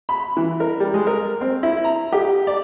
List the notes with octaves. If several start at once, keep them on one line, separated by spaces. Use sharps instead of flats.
B5
E3
A#4
G3
G#3
A#4
C4
E4
A#5
G4
D5